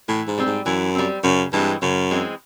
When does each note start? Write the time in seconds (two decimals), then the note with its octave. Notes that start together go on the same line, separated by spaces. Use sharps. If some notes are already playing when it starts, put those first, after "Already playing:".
0.08 A2 E3
0.27 G#2
0.38 G3 C4
0.46 G#2
0.66 F#2 E3
0.95 G3 C4
1.23 F#2 C#3
1.53 G2 E3 G#3 C4
1.82 F#2 C#3
2.11 E3 G#3 C4